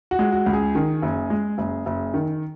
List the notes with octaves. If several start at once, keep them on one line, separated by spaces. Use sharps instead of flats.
F#4
G#3
F#4
C#2
G#4
D#3
F#1
G#3
F#1
F#1
D#3